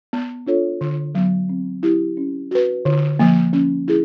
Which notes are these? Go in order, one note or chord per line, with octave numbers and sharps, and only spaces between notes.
B3
D4 F4 A4 C#5
D3
F#3 B3
C4
E4 G4
C#4
F#4 B4
D3
F3 A#3
C#4
E4 G#4